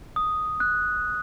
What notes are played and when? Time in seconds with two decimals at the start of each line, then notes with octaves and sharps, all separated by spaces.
0.16 D#6
0.60 F#6